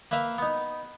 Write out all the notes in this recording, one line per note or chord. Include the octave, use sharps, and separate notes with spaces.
A#3 B4 E5 A#5
B3 D#4